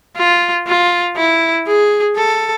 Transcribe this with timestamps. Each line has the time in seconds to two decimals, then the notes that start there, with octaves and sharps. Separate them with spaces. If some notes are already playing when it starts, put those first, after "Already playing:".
0.16 F4
0.67 F4
1.17 E4
1.67 G#4
2.16 A4